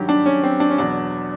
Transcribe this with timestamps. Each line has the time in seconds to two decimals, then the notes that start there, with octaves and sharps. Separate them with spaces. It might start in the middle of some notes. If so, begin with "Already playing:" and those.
Already playing: G2 D#3 F#3 G4
0.09 D4
0.26 C#4
0.44 C4
0.60 D4
0.70 C#4
0.78 E2 B2 F#3 D4